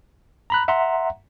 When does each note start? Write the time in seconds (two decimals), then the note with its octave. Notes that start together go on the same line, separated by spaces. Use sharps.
0.50 A#5 B5 F#6
0.68 E5 F#5 A#5 C6